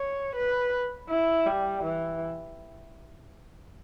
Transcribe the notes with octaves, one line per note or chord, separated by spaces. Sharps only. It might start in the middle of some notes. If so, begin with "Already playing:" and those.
Already playing: C#5
B4
E4
G3
E3